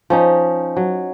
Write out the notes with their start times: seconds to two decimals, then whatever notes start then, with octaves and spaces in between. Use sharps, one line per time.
0.10 F3 C#4 D#4
0.77 F#3